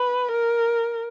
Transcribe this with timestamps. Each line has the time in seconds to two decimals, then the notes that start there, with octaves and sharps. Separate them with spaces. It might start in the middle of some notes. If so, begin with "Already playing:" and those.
Already playing: B4
0.31 A#4